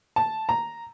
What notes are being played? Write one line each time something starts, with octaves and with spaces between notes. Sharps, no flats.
A5
A#5